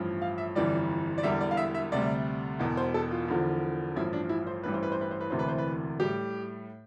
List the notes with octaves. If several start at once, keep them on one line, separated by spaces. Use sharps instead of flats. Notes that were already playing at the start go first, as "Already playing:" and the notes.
Already playing: A1 G2 F3
F5
E5
G1 F2 E3 G3 D5
D5
E1 E2 D3 G3 E5
D5
F5
E5
E5
D2 C3 G3 D5
E1 E2 B2
C5
A4
F4
E1 E2 D3 F3
A1 G2 F3 E4
D4
E4
C5
A1 G2 E3 G3 B4
C5
B4
C5
B4
C5
B4
E1 D2 C3 E3 C5
B4
C5
B4
A2 G3 G4